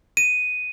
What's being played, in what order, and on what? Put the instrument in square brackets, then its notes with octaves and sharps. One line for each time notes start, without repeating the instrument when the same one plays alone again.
[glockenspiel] D#7